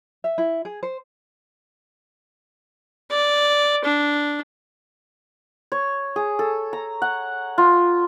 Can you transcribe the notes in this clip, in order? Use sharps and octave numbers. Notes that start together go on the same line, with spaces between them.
E5
E4
G#4
C5
D5
D4
C#5
G#4
A4
A#5
F#5
F4